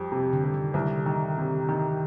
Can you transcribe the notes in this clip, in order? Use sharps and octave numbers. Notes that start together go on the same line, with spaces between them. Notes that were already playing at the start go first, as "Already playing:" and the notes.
Already playing: F2 G3
C3
D3
G3
D#3
C2 D3
D#3
C3
D#3